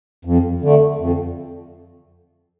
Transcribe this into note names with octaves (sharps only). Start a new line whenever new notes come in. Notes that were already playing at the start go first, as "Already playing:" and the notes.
F2
D3 A3
F2